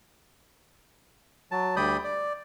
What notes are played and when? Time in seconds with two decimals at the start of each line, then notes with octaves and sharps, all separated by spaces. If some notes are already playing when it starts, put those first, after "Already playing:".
1.51 F#3 A5
1.76 D2 G3 D5 B5 D#6 G6
2.04 D5